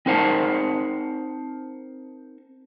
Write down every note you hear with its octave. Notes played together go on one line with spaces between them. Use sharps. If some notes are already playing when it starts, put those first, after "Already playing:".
C4 D#4 A#4 C5 F#5 A5